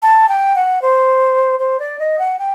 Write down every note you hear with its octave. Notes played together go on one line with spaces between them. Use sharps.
A5
G5
F#5
C5
C5
D5
D#5
F#5
G5